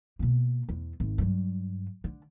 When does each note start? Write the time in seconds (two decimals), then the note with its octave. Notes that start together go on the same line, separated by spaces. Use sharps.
0.19 B2 A#3
0.69 E2
1.00 G#1
1.18 G2 F#3
2.04 D3